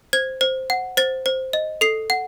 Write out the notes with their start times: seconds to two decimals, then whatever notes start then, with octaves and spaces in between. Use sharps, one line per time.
0.13 C5 G#6
0.41 C5
0.70 F#5
0.97 C5 A6
1.26 C5
1.53 D#5
1.81 A4 C7
2.10 F#5